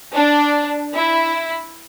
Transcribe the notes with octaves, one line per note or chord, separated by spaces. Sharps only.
D4
E4